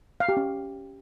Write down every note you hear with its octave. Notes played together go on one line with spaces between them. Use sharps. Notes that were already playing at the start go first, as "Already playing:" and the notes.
F5
G4
C#4